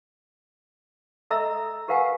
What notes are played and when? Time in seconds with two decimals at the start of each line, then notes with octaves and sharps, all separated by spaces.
1.31 A4 D#5 E5 A#5 E6
1.88 G4 A#4 B4 F5 F#5 G#5